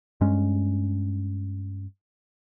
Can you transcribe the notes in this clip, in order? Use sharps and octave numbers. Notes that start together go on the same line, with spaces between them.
G2 G#3 C#4